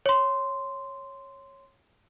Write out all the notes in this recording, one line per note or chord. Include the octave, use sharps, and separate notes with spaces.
C#5 C6